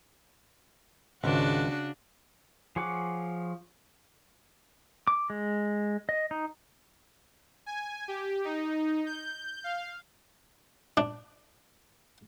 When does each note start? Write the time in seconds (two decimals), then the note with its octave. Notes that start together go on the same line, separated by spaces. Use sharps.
1.24 G#1 C#2 C#3 D4 F#4
2.76 F3 G#4 C#5 F#5 D6
5.07 D6
5.30 G#3
6.09 D#5
6.31 D#4
7.66 G#5
8.08 G4
8.45 D#4
9.06 G6
9.64 F5
10.97 D4